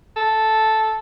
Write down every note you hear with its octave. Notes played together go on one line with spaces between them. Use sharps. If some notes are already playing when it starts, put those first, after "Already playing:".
A4